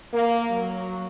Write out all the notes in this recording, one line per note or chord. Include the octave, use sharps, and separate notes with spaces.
A#3
F#3